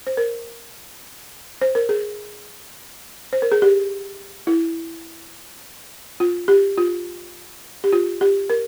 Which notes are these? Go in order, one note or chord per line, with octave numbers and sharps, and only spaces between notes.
C5
A#4
C5
A#4
G#4
C5
A#4
G#4
G4
E4
F4
G4
F4
G4
F4
G4
A#4